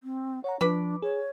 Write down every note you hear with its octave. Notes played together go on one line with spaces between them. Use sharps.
C4
C#5 F#5 A#5
F3 D4 B4 B5 D6
G#4 C#5